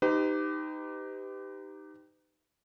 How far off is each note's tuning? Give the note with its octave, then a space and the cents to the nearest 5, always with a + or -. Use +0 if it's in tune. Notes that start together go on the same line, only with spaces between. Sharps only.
D#4 +0 G4 +0 B4 +40